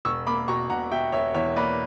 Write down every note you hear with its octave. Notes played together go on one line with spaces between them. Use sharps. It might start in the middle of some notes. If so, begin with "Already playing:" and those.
E1 C#6 E6
A#3 B5 D6
B2 A#5 C#6
E1 F#5 A#5
B2 E5 G5
E1 C#5 E5
E2 C#5 E5
A#3 B4 D5